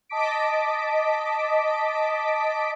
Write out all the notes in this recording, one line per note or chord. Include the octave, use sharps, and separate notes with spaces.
D#5 A5 D6 B6 D7